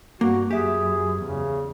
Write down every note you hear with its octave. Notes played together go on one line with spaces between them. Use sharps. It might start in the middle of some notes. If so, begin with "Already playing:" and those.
G2 A#3 F#4
F#2 G4 G#4 E5
E2 C#3